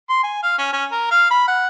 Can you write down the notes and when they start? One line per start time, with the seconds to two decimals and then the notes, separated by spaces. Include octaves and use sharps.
0.09 C6
0.23 G#5
0.43 F5
0.58 C#4
0.73 C#4
0.92 A#4
1.11 F5
1.30 B5
1.47 F#5